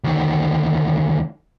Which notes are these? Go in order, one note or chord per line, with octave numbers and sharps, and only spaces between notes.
D2 D#3